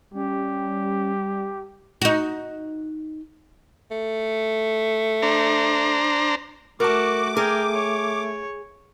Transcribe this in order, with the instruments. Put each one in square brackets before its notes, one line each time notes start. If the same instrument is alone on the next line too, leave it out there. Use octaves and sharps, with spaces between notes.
[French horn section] G3 [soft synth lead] C#4 [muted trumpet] G4
[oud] D#4 F#4
[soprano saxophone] A3
[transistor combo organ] D4 C5 A#5
[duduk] A3 [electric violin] F#4 [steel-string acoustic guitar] A#4 A5 [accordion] D6
[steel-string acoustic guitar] G#4 [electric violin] A#4 G5
[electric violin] C#5